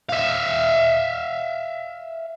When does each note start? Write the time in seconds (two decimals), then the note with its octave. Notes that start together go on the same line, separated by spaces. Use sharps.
0.09 E5 F5